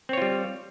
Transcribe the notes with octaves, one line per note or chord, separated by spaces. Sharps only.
G3 C4 F4 C#5